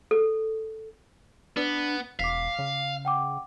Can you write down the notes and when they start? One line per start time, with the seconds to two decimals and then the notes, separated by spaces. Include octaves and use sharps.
0.11 A4
1.57 B3 D4 B4
2.20 E1 F5 D6 B6
2.59 C#3
3.05 F#5 G5 D6